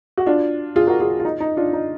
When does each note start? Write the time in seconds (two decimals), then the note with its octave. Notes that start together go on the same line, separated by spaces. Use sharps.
0.17 F#4
0.26 D4 F4
0.76 F4 G#4
0.87 F#4 A#4
1.00 F4 G#4
1.20 F4
1.25 D#4
1.40 D#4
1.57 D4 F4
1.73 D#4